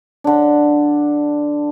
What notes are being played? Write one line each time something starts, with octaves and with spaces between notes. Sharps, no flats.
D3 D4